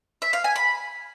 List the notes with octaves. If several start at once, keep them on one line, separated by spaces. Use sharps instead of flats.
E5
F5
G#5
B5